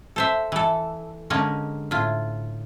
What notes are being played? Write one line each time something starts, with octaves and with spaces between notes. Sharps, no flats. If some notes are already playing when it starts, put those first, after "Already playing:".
A4 C5 E5
E3 A4
D3 G#3 A#3 C#4 D#4
A2 F4